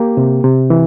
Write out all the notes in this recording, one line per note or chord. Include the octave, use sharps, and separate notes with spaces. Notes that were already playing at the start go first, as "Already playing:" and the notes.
Already playing: A#3 G4
C3
C3
E3